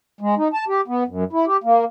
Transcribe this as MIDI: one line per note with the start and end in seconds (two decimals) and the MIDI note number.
0.21 0.35 56
0.38 0.48 63
0.53 0.64 81
0.68 0.81 67
0.88 1.04 59
1.07 1.24 42
1.33 1.45 64
1.46 1.57 67
1.64 1.85 58